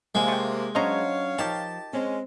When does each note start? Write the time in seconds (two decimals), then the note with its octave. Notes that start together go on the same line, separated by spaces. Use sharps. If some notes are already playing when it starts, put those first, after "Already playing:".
0.15 C3 G#3 A#3 F5 G#5
0.28 A3 G5
0.75 F#3 C#4 D4 C5 C#5 D#5 F5 A#5
1.39 D#3 F3 G4 A5
1.93 G#3 C4 C#4